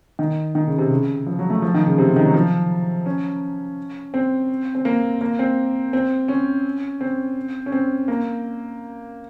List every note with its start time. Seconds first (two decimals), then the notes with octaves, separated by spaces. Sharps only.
0.19 D#3
0.55 D#3
0.67 C#3
0.78 C3
0.91 C#3
1.26 F3
1.39 F#3
1.50 A3
1.62 F3
1.74 D#3
1.87 C#3
1.98 C3
2.08 C#3
2.16 D#3
2.25 F#3
2.34 F3
3.06 C#4
4.14 C4
4.75 C4
4.85 A#3
5.21 A#3
5.39 C4
5.93 C4
6.28 C#4
7.01 C4
7.66 C#4
7.72 C4
8.08 A#3